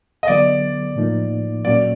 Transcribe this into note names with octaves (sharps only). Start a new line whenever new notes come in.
D#5
D3 F#3 B3 D5
A2 F3 A#3 D#4
A#2 F#3 A#3 C#4 F#4 D5